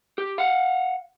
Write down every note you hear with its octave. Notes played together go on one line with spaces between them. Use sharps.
G4
F5 F#5